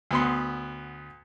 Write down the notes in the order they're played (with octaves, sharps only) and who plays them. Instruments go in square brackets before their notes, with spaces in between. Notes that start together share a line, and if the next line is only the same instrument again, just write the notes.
[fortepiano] D2 B3 C6